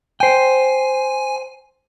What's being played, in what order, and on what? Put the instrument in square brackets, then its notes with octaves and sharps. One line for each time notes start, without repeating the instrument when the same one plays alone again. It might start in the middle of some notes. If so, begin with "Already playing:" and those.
[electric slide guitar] C5 G5 [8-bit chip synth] G#5